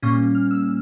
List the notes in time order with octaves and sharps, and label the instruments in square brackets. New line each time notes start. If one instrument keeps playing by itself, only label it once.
[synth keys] A#2 G3 A#3 C#4 C#6
F6
E6